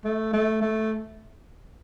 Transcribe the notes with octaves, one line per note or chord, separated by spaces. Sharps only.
A3
A3
A3